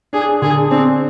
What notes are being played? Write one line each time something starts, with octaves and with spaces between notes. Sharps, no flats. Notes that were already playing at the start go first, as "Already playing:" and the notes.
D4 G#4
D3 G#4
C4 D4